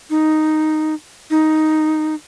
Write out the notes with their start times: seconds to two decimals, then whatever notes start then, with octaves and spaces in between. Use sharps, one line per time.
0.10 D#4
1.30 D#4